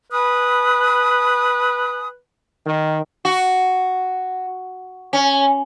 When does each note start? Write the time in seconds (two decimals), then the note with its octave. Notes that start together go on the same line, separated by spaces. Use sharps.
0.12 B4 G#5 B5 D#6
2.66 D#3
3.25 F#4
5.13 C#4